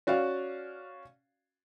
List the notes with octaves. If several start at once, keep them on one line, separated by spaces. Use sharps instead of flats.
C#4 F#4 D5 F5